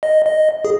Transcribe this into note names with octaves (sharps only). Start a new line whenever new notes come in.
D#5
D#5
G#4